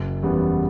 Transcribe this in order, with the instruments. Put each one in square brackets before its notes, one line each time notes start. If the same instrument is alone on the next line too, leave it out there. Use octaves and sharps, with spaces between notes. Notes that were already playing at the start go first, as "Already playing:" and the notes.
Already playing: [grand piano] F#1
E2 C#3 G3 B3